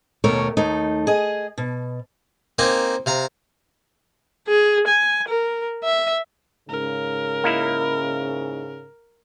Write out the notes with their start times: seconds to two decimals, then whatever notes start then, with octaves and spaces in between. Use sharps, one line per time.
0.24 D#2 B2 A3 A#4 C#5
0.57 D#2 A3 D#4
1.07 G#4 D#5
1.58 B2
2.59 A#3 C4 D#4 G#5 D6
3.06 C3 F5 A#5
4.48 G#4
4.87 G#5
5.28 A#4
5.84 E5
6.69 G#2 C#3 A#4
7.44 A#3 D#4 E4